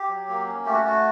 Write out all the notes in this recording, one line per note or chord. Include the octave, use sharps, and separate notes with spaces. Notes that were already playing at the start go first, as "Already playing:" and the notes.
Already playing: G4
F#3
A#3
C#4
A3 G4
F#4
A3 F#4